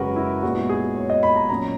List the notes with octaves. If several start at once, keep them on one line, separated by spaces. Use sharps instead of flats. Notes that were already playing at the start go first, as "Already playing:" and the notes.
Already playing: F#2 C#3 G#3 C#4 F#4 G#4 A#4 B4
E4
A#2 G#3 B3 F#4
E4
G#4
C#5
D#5
B5
A#5
A#2 F#3 C#4 A#5